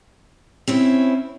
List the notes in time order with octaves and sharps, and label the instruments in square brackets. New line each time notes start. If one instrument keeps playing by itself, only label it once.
[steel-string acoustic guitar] C4 C#4 E4